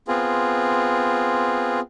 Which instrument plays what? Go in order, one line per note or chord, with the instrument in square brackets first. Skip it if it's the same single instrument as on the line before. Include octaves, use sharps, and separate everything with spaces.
[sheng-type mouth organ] B3 C4 F4 G#4